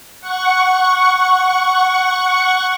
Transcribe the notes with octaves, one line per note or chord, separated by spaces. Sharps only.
F#5 C#6